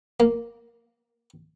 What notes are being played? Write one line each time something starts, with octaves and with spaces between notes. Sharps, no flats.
A#3